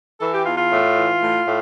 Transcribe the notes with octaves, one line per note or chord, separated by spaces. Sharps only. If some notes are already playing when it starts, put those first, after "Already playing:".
E3 A4
G4
E2 F4
F4
A2
E3
A2
A2